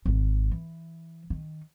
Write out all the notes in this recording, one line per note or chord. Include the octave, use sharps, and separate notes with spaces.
G#1 D#3
E3
D#3